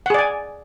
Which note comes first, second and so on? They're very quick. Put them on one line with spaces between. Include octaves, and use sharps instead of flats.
F#5 G#4 D5 G#5